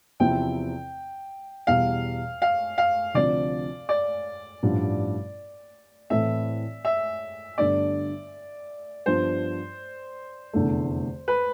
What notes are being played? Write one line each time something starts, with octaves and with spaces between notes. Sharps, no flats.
E2 C3 F3 C4 E4 G5
E2 B2 G3 F5
F5
F5
D2 C3 F3 C4 F4 D5
D5
A1 G2 F3
A2 E3 A3 C4 E5
E5
G1 G2 D3 A3 D4 D5
G2 F3 B3 D4 F4 C5
F1 E2 D3 A3
B4